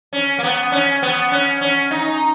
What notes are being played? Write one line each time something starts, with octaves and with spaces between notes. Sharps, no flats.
C#4
A#3
B3
C#4
B3
C#4
C#4
D#4